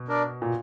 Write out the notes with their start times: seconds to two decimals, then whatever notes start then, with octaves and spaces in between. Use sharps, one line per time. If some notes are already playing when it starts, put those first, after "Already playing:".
Already playing: B2
0.08 D4 A#4 D5
0.42 A#2